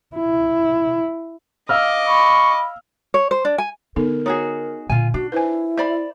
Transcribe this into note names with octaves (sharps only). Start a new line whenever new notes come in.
E4
D#5 F5 D6 E6 F6
B5 C#6
C#5
C5
D4
G#5
D3 B3 D#4 A4 A#4
D#4 F#4 G#4 C#5
A#2 D3 F4 G#5
D4 D#4 F#4
E4 B4 C5 G#5
C5 D5 E5 B5